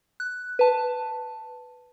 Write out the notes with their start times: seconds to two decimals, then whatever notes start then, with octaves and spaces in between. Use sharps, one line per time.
0.20 F#6
0.59 B4 A5